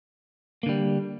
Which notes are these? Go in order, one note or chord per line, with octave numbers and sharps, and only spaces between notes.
D3 G3 A#3